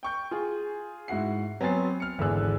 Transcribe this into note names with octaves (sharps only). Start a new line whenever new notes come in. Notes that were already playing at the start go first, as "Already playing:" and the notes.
G5 C#6 G6
F4 G#4
G#2 E4 F#4 F#5 C7
F#3 B3 C4 G#5 A6 C7
F6 C#7
G#1 E2 D3 G#4 E6 F#6